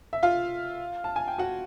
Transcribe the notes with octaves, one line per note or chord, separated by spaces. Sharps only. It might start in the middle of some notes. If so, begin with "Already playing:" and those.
E5
F4 F5
A5
G#5
G5
F#4 F#5